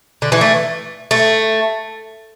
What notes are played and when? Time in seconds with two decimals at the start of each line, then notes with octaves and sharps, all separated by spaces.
0.22 D3
0.32 E3
0.41 A3
1.11 A3